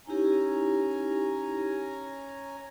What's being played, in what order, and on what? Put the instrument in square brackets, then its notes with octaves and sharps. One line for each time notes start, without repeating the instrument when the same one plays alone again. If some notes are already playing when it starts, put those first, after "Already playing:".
[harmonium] C#4 G#5 A#5 [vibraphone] D#4 E4 G4